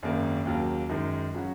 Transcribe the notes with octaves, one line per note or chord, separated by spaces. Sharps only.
G#1 F#2 C#3 A#3
D#2 C#3 F#3 A#3
F#2 D#3 G#3 D#4
C#3 F#3 C#4 F#4